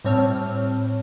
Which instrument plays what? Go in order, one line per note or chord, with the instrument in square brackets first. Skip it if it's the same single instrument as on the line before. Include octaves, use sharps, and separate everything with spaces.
[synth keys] A2 G3 C4 C#5 A5 F6